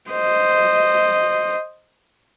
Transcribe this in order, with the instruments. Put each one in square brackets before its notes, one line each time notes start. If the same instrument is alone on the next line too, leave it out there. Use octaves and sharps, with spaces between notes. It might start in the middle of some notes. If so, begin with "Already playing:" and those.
[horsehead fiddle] C5 D#5